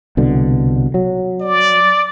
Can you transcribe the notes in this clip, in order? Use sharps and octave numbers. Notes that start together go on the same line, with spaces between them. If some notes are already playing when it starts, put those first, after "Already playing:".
C2 B2 D3
F#3
D5